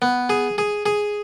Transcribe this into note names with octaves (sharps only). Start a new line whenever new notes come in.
B3
G#4
G#4
G#4